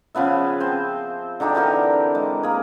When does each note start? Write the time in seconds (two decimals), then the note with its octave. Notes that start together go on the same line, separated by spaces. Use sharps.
0.15 C#3 F3 B3 E5
0.60 C4 C5
1.40 D3 D4 D#4 G4
1.55 D3 E3 G4 A#4
2.15 G#3
2.43 A#3 G#4